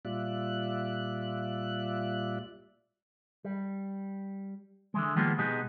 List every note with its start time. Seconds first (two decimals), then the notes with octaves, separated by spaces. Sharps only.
0.05 A#2 G3 F4 D5 E5 F#6
3.45 G3
4.94 D3 E3 G#3
5.16 D#3 F3 G3 G#3 A#3 B3
5.38 B2 G#3 B3 D#4 G4 G#4